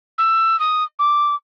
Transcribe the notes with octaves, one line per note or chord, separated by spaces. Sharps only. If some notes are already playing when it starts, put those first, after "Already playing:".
E6
D#6
D6